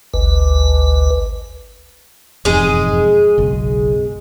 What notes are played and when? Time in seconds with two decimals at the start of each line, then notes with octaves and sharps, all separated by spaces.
0.14 G#1 D2 B4
2.45 E1 F2 G#2 G#3 G#4
3.38 F#1 B1